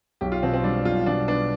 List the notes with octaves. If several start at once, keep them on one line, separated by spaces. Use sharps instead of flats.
B1 G4
F4
B2 C4
C4
G3 D4
B1 F4
B2 D4
B3 D4